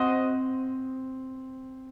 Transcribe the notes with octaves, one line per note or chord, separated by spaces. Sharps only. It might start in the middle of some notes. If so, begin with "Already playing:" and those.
Already playing: C4 F#4 C5 D#5 F#5